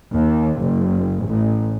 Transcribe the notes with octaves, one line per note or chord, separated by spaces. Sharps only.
D#2
F#1
A1